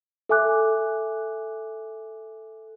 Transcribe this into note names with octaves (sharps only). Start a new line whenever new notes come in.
A4 E5 G#5 D6 F#6